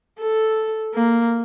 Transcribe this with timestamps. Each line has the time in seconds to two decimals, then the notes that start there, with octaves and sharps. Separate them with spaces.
0.19 A4
0.95 A#3